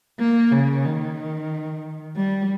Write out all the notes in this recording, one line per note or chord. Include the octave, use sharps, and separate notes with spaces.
A#3
C#3
D#3
G3